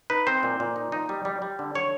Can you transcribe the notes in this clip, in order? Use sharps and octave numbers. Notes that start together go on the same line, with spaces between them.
D#4 B4
C4 C5
A#2
A#2
D#4
D#4
G3
G3
G3
D3
D3 C#5